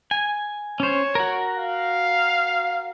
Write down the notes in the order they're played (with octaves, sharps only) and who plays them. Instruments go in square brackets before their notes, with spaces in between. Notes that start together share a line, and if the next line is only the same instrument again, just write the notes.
[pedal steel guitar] G#5
[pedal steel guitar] C#4 C5 [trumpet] C#5
[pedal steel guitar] F#4 A#4
[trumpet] F5